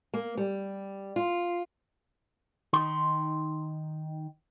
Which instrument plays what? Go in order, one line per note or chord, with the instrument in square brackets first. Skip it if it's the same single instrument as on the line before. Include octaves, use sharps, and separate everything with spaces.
[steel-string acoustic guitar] A#3
G3
F4
[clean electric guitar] D#3 D#4 C6